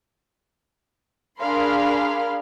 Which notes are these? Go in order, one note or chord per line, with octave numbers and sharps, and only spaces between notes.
D4 G#4 A#4 F5 B5 C6